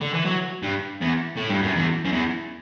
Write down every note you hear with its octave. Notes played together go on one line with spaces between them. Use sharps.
D3
E3
F#3
G2
E2
A2
G2
F#2
E2
F#2
E2